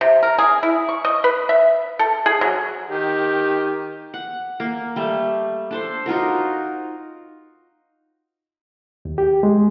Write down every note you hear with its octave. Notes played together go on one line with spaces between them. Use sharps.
C3
A#4
G#4
E4
C#6
D#5
B4
E5
A4
G#4
F#3
D#3 G4
F#5
A#3
G3 A3
D4 A4 C5
D#4 F4 F#4 A#4
D#2
G4
G#3